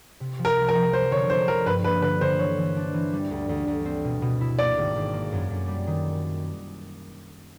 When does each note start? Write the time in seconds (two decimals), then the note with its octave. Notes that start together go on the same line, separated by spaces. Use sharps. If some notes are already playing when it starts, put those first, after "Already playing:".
0.20 C3
0.39 F3
0.45 A#4
0.57 C2
0.69 A#4
0.75 F3
0.93 F3 C5
1.11 D3 C#5
1.30 D3 C5
1.48 F3 A#4
1.66 G2 B4
1.84 A#3 B4
2.02 D3 B4
2.21 D3 C5
2.39 E3 C#5
2.58 E3
2.77 D4
2.94 E3
3.13 G3
3.31 D2
3.49 D2
3.67 D2
3.85 C4
4.05 B2
4.22 B2
4.41 E4
4.59 A#3 D5
4.78 G#1
4.96 G#1
5.13 A#3
5.32 F#2
5.50 F#2
5.68 G3
5.87 D#3